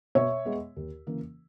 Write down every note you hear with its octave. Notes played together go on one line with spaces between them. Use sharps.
B2 C#5 E5
G#3 B3
D#2
C#3 E3 A#3